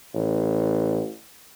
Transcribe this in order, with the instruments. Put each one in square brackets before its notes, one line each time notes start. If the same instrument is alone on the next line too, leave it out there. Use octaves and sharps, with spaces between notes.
[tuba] A1